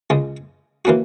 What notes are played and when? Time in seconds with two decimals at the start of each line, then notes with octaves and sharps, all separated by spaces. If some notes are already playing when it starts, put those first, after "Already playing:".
0.10 C#2 C#3 G#3
0.85 E3 A#3 C#4 F#4